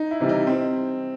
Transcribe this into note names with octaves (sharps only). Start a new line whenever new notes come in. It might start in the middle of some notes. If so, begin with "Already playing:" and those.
Already playing: D#4
E4
C3 E3 G3
D#4
C4